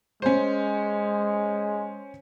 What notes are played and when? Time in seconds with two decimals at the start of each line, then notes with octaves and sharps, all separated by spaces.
0.22 G#3 C#4 C5